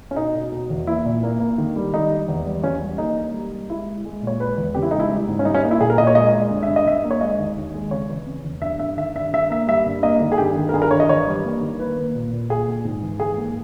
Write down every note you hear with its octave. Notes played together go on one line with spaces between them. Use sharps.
C#4
B2 D#4
B2
B2
E2
A#3 E4
A#2
A#3
A#3
D#3
G3
G3 D#4
G3
E2
G3
E2 C#4
G3
A#3 D#4
A#3
G3
G3
G#3 E4
G#3
G#3
A#2 C#5
G#3 B4
E2
C#3 G4
E4
G#3 D#4
E4
G3
G#2
C#4
G3 D#4
C#4
A#3 D#4
E4
A#2 G#4
A#4
A#2 D#5
C#5
G#3 D#5
G#3
G2
E5
G2
D#5
G2 E5
A#3
C#5
G#3 D#5
D#2
D#2
G#3
C#3 C#5
E3
C#3
E2
G2 E5
G2 E5
D#3 E5
G2 E5
G2 E5
A#3 E5
G3 E5
G2
A#3 D#5
D#3
G#4
G2 G4
D#3
A#4
G2 G#4
A#4
G2 C#5
D#5
E3 C#5
G3
A#3
D#3
A#3 B4
A#3
A#2
A#2
A#2 G#4
A#2
G#2
E3
G#2 G#4
A#3